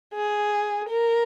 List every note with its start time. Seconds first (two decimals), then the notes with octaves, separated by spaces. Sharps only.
0.14 G#4
0.89 A#4